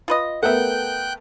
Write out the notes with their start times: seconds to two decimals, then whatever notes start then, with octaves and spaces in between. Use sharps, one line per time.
0.08 F4 B4 D#5
0.43 A3 B3 A#4 E5 F#5 G5 F#6 G6